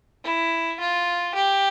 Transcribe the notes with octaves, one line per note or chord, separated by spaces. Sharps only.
E4
F4
G4